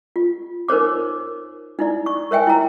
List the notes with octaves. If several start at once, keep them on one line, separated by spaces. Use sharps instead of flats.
F4
D#4 A#4 C5 C#5 D6
D#4 E4 D5
C#6
A#4 C#5 E5 G5 G#5
E4 A#5